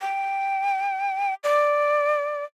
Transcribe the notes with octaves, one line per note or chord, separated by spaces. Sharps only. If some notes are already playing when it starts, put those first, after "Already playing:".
G5
D5